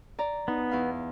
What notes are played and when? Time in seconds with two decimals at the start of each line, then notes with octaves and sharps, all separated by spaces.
0.19 D5 A#5
0.48 B3 D#4
0.69 E2 F5 B5